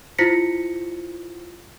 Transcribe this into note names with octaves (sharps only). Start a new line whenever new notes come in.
E4 F4 C5 A#6 B6 C#7